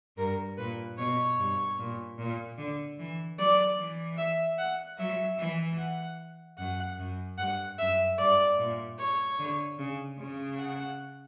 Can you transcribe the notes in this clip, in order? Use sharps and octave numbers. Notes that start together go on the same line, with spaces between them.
G2 A#4
A#2 B4
B2 C#5
G2
A#2
A#2
D3
E3
F#3 D5
E3
E5
F#5
F#3 E5
E3
F#5
F#2 F#5
F#2
G2 F#5
F#2 E5
G2 D5
A#2
C#5
D3
C#3
C#3
F#5